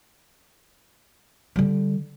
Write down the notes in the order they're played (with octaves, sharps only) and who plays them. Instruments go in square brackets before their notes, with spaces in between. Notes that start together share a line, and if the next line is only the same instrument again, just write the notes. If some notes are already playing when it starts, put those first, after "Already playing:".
[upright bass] D3 G3